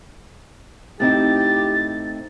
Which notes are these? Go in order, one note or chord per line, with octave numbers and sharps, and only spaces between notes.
A2 C4 D#4 G4 A6